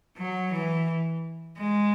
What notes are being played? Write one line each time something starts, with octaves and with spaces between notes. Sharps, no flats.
F#3
E3
G#3